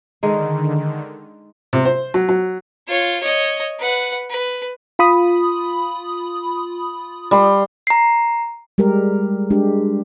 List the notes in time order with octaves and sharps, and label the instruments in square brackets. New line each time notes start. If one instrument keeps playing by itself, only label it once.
[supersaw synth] D3 D#3 [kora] G#3 D#4
[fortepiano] C3
C5
F#3
F#3
[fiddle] F4 C#5
C#5 D#5
B4 F#5
B4
[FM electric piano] F4 B5 D#6
[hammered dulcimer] G3 C6
[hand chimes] A#5 C7
[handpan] G3 G#3 G4 A#4
G#3 D4 G4